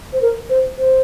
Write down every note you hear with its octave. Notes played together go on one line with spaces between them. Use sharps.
C5
A#4
C5
C5